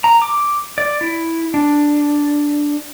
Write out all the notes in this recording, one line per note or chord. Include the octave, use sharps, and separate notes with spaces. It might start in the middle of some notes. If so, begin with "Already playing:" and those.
A#5
D6
D5
E4
D4